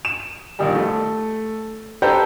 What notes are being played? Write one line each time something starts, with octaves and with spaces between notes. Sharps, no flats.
E7
A#1 D#3 G3
A3
G4 A4 B4 C5 A#5 G6